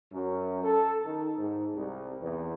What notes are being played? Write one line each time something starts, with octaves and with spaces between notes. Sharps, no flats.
F#2
A4
D#3
G#2
C2
E2